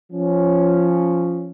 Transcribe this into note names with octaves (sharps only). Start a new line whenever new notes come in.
F3 C#4